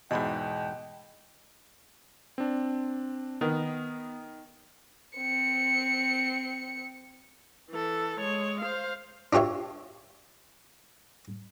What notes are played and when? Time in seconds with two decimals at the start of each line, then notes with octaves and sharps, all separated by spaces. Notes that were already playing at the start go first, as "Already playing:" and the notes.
0.11 E2 G#2 B2 D#5 G5 B5
2.38 C4 D4
3.41 D#3 B3
5.16 C4 C#7
7.70 E3 A4
8.20 G#3 C#5
8.61 C5 F5
9.33 D4 F4 G4 C#5 E5